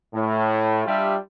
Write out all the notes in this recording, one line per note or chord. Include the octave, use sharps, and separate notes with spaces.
A2
G3 D4 F4 G4 E5